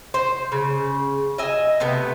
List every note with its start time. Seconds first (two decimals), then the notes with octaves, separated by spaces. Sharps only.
0.14 C5
0.52 C#3
1.38 D#5 E5 G#5
1.80 C3 A3 B3